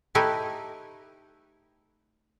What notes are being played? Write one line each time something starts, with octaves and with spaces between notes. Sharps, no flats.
A3 D#4 E4 G4 B4